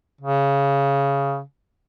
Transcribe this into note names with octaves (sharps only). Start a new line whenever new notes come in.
C#3